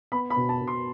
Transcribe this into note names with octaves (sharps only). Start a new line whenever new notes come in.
B3 B5
B5
B2
A5
B2
C6